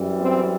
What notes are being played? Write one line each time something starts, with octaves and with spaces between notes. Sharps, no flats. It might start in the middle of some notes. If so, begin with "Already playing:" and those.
Already playing: F#2 E3 G3
C4